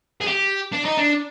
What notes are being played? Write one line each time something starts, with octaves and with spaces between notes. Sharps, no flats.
G#4
G4
D4
D#4
D4